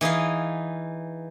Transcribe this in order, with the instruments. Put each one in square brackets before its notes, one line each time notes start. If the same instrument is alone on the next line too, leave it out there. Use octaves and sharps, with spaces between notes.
[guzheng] E3 D#4 G#4 F5